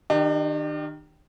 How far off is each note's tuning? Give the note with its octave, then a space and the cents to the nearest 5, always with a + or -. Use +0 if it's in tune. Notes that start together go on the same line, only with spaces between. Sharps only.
D#3 +0 D4 +45 G4 +0